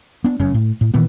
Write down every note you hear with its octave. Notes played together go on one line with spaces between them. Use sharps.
B3 D4
F1 F#2 C#3 C#4
A2
A2
A#2 D#3 E3 B3